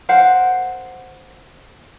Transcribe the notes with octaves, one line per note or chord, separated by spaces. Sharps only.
A#4 C5 F5 F#5